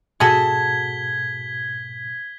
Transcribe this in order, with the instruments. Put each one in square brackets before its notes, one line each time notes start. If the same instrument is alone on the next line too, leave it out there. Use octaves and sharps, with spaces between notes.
[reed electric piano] G#2 B2 [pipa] F#4 G#4 A4 [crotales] G#6 B6 G7